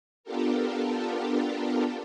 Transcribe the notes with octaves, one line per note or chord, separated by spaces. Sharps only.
B3 D4 F4 G4 A4 A#4